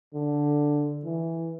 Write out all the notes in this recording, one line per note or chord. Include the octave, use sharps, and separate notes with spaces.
D3
E3